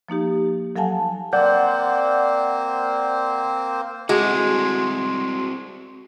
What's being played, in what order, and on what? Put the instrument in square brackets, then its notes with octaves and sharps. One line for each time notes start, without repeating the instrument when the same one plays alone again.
[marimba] F3 A#3 D#4 G4
F#3 A4 F5 F#5 G#5 A5
[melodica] A#3 C4 C5 [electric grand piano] D5 F#5 G6
[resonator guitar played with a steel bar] G#3 [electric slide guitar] C4 E4 A4 [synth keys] F#4 [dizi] C6